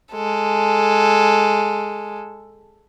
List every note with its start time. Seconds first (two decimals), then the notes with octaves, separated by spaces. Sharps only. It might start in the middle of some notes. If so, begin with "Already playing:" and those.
0.12 G#3 A4